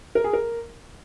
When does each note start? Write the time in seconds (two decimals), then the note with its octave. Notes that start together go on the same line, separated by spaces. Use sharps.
0.15 A#4
0.24 G#4
0.33 A#4